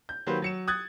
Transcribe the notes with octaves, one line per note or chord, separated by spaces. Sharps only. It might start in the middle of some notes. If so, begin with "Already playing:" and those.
G6
D#3 F#3 A#3 G4 B4 C5
F#3 C#7 E7
D#6 F#6 G#6 A6